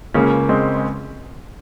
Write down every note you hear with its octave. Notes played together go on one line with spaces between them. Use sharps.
C#2 C#3 A#3 C#4
G#3 C4
G#3